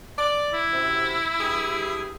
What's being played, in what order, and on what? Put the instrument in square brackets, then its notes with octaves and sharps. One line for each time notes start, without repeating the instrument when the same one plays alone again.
[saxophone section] D5
[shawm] E4
[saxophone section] F#2 C3
G2 G4 G#4